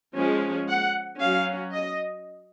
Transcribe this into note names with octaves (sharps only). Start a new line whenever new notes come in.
F3 G#3 C#4
F#5
F#3 C#4 F5
D#5